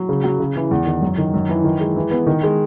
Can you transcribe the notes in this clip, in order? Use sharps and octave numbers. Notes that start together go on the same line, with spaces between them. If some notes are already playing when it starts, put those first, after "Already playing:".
Already playing: F#3
C#3
F#3
C#3
E3
E2
D#3
F#2
D#3
F#2
E3
D#3
G#3
E3
B3
D#3
G#3